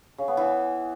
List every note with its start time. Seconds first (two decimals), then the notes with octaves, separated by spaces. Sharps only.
0.18 C#3
0.28 B3
0.37 E3